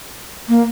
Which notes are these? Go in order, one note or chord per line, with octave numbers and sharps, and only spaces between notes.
A#3